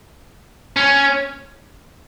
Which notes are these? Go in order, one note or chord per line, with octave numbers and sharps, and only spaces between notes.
C#4